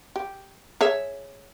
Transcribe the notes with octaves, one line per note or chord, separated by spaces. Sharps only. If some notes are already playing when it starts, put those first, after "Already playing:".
G4
G#4 C#5 E5